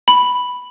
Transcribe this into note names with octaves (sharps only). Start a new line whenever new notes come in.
B5